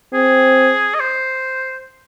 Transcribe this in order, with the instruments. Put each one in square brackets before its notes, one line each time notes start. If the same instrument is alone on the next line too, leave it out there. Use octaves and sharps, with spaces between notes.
[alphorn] C4 [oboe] G#4
[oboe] D#5
C5